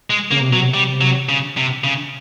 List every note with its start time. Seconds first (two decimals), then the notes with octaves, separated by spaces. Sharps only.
0.10 G#3
0.31 C#3 A#3
0.41 C3
0.50 B2 F#3
0.59 C3
0.74 G3
1.01 F#3
1.29 C#3
1.57 C3
1.84 C#3